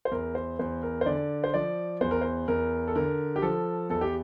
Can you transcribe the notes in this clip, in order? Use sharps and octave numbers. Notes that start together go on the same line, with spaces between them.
C5
E2 A#4
C5
E2 C5
A#4
C5
D3 D5
C5
F3 D5
E2 C5
A#4
C5
E2 A#4
A4
D3 A#4
G4
F3 A4
E2 A4
G4